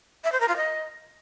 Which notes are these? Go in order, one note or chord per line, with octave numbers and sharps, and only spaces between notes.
E5
C5
A#4
F4
D#5